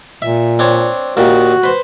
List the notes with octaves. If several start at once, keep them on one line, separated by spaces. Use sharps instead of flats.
A#2 E5
C4 D4 C#5
D#2 A#2 D#3 F#4
B4 C5